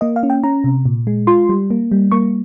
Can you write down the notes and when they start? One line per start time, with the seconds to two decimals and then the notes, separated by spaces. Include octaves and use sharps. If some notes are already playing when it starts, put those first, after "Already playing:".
0.01 A#3 D#5
0.16 F5
0.23 C#4
0.30 G5
0.44 C#4 A#5
0.64 C3
0.85 A#2
1.07 G#3
1.27 F4 C6
1.49 G3
1.70 A#3
1.92 G3
2.12 A#3 C#6